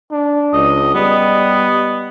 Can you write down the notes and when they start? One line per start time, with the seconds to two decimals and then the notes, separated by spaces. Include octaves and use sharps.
0.12 D4
0.53 C#2 D#5
0.95 G3 B3 D#5